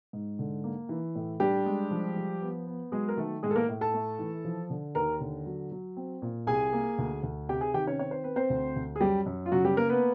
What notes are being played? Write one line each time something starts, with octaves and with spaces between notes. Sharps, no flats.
G#2
D3
A#3
E3
A2
G3 D4 G4
G#3
F3
F3
B3
B3
F#3 G#3 G#4
A#4
D#3 A3 A4
A2 G#3 G#4
A4
A#3 A#4
A2
A4 A5
A3
E3
F3
D3
D#2 A#4 A#5
D3
F#3
F#3
C4
A#2
C2 G#4 G#5
A#3
D2
D2
C3 G4 G5
G#4 G#5
D#3 G4 G5
C#4 C#5
C4 C#5
C5
C4 B4
C4 C5
D2
D2
G#4
F#2 G3 G4
F#2
F4
C#3 F#3 F#4
G3 G4
A#3 A#4
B3 B4